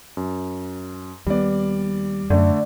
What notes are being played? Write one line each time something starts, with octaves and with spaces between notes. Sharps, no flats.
F#2
D#2 G3 B3 D5
F#2 D3 A3 D5